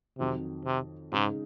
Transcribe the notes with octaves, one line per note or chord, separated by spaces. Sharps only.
F2 C3 D#3 F#3
C3
G#2 C#3 G#3 D#4